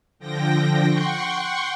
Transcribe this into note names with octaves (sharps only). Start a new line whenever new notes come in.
D3 F3 G5 A#6
F#5 G5 C6 C#6